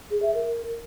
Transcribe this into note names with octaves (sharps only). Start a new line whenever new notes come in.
G#4
E5
A#4